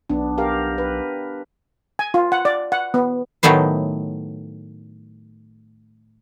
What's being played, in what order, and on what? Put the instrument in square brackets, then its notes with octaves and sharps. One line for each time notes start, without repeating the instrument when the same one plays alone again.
[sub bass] B1 [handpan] B3 D4
[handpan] G4 A#4 F5
B4
[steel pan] G#5
F4
F#5
D5
F#5
B3
[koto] A2 D#3 F#3 A3 B3 C5